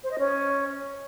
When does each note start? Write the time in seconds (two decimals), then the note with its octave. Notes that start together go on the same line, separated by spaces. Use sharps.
0.03 C5
0.11 D#5
0.19 C#4